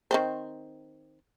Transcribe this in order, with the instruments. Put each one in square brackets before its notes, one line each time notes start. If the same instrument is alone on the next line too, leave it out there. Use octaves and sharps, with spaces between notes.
[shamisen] D#3 C4 C5